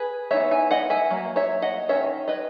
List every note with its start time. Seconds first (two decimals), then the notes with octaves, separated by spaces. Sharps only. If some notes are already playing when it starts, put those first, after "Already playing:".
Already playing: G#4 B4
0.31 E3 B3 D#4 C#5 E5
0.51 E5 G#5
0.71 D#5 F#5
0.90 E5 G#5
1.10 F#3 A#3
1.36 C#5 E5
1.62 D#5 F#5
1.89 D#3 F#3 C#4 C#5 E5
2.28 B4 D#5